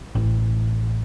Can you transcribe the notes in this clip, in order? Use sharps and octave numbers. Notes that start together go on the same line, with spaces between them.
A1